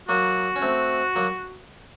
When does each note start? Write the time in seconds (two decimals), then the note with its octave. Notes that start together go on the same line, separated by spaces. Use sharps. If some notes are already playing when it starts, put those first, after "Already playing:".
0.09 F#3 A#3 F#4
0.56 C#4
0.62 A3 C4
1.16 F#3 A#3